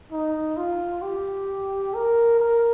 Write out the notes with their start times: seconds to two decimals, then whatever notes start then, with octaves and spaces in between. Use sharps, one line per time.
0.12 D#4
0.57 F4
1.02 G4
1.95 A#4
2.40 A#4